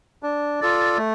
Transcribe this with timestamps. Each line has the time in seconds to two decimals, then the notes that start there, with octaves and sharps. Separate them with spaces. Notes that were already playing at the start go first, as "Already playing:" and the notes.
0.23 D4
0.60 F4 A4 D5
0.97 A3